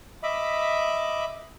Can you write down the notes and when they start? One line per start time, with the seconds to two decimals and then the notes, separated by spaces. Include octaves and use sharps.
0.23 D#5 E5 B5 D6